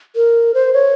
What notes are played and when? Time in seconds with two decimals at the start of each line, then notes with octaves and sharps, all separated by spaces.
0.16 A#4
0.54 C5
0.73 C#5